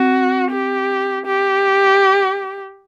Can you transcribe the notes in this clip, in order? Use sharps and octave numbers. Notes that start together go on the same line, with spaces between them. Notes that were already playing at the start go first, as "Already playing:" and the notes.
Already playing: C4 F#4
G4
G4